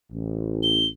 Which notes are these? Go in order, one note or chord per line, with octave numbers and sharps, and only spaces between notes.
A1
G7